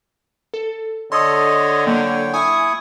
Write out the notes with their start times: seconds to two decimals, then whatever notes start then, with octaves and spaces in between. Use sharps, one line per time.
0.54 A4
1.12 D3 A4 C#5 D#5 C6 D#6
1.86 F#3 A#3 E4 C#5 G5
2.34 E4 G#5 C#6 D#6 G#6